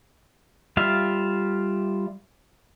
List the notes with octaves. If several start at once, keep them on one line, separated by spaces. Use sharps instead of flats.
G3 F4 E5 F5